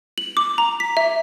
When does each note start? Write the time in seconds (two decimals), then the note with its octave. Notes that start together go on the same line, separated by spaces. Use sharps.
0.18 F#7
0.37 D6
0.58 A#5
0.80 B6
0.97 E5